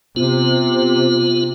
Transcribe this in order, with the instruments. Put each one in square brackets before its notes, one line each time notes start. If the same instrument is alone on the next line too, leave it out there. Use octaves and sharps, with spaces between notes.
[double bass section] C3 [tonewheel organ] B3 F4